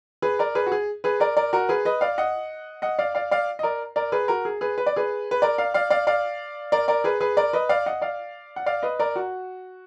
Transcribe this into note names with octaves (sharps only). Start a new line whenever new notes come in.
G#4 B4
A#4 D5
G#4 B4
F#4
G#4
G#4 B4
A#4 D5
A#4 D5
F#4 A#4
G#4 B4
B4 D#5
D5 F5
D#5 F#5
D#5 F#5
D5 F5
D5 F5
D5 F5
D#5
A#4 D5
A#4 D5
G#4 B4
F#4 A#4
G#4
G#4 B4
B4
D5
G#4 B4
B4
A#4 D5
D5 F5
D5 F5
D5 F5
D5 F5
A#4 D5
A#4 D5
G#4 B4
G#4 B4
A#4 D5
B4 D#5
D5 F5
D#5 F#5
D5 F5
F#5
D5 F5
B4 D#5
A#4 D5
F#4